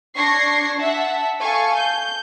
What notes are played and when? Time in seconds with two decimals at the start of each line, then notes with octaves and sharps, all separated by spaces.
0.16 D4 C#6 G#6 A#6 C7
0.80 E5 F#5 A5
1.41 A4 F5 G#5 C#6
1.77 G6